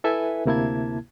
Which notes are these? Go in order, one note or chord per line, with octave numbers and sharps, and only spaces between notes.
E4 A4 B4 E5 G#5
D2 C3 A#3 E4 A5 G#6